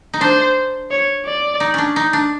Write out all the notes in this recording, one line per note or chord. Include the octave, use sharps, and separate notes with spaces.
D#4
D4 C5
C#5
D5
D#4
C#4 D4
D#4
D4